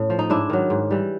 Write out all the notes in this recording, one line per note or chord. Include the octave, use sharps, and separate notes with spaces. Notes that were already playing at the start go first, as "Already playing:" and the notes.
Already playing: A2 C#4
F3
D#4
G#2 D4 E4
D#3 F#3
G#2
E3 G3